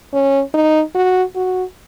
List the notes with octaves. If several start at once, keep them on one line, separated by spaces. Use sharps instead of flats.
C#4
D#4
F#4
F#4